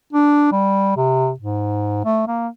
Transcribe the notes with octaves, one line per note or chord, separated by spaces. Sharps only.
D4
G3
C3
G#2
A3
A#3